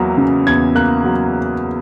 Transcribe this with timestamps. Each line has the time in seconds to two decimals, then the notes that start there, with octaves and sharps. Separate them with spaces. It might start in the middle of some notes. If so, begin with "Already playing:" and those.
Already playing: E2 F#3 A#3
0.18 C#3
0.47 E2 G#6
0.75 A#3 F#6
1.04 F#3